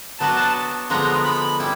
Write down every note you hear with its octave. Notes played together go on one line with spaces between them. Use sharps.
F#3 B3 D4 F#4 B4 A5
D3 F3 G#3 B3 A#5
B5
G3 E4